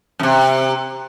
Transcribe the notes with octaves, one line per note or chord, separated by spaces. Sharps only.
F#2 C3